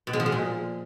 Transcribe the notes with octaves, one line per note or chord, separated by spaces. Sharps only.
B2
G#3
F3
G#3
A#2